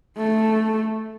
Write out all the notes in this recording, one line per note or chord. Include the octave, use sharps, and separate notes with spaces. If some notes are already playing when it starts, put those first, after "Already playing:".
A3